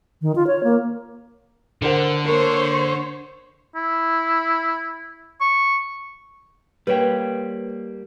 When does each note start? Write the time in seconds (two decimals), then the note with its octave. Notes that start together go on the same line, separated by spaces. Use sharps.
0.22 D#3
0.36 F4
0.47 C#5
0.64 A#3
1.82 D3 A#4 C5 F#5
2.25 A#3 A#4 C5 C#5
3.76 E4
5.41 C#6
6.87 G3 A#3 B4 C#5 G5